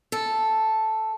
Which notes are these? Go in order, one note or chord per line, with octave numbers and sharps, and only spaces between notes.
A4